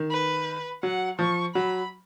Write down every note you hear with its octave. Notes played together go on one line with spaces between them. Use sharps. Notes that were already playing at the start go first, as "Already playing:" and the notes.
Already playing: D#3
B4
F#3 F#5
F3 C#6
F#3 B5